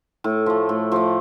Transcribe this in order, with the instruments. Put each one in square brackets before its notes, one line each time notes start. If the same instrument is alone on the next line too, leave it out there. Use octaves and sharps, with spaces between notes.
[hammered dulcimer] A2
F3 A3
A2
F3 A3